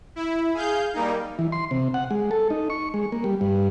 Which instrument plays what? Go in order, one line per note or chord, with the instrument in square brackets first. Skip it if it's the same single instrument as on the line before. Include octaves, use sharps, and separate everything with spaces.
[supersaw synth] E4
G#4 F5 G6
G3 A#3 D#4
[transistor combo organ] E3
C6
C3
F#5
G#3
A4
D#4
C#6
G#3
A#3
G3
G2